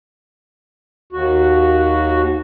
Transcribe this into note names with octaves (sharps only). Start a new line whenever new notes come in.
D#2 F#4